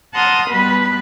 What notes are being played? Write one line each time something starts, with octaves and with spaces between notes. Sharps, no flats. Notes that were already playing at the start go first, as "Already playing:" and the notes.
F#5 A5 A#5 C6 D#6 F6
B2 G3 B4 B5